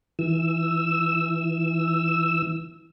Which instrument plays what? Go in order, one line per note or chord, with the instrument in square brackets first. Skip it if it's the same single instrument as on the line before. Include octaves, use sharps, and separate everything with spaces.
[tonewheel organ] E3 E6